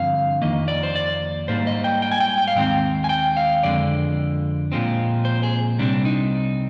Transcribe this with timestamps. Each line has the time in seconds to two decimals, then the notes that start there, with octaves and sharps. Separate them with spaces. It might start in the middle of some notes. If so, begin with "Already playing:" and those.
Already playing: G2 D3 F3 C4 F5
0.41 F2 D#3 A#3 D#5
0.68 D5
0.83 C5
0.96 D5
1.48 G#2 G3 A#3 C5
1.67 D#5
1.84 G5
2.02 G5
2.12 G#5
2.20 G5
2.38 G5
2.48 F5
2.56 D#2 D#3 G#3 C4 G5
3.04 G#5
3.09 G5
3.37 F5
3.63 F2 D3 G#3 D5
4.72 A#2 F3 G#3 C4
5.25 C5
5.43 G#4
5.78 C2 C3 G3 C4 D4
6.05 D#4